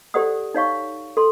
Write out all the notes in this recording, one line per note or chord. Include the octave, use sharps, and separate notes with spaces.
G4 A4 C5 D5 F#5 D#6
D#4 C#5 F5 C#6
A4 C6